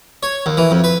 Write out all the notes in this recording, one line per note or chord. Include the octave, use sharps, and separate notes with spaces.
C#5
D#2
E3
F2
B4